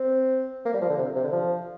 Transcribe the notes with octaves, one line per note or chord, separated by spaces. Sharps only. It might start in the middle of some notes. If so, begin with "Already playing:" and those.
Already playing: C4
A#3
G3
F3
D3
C3
C3
D3
F3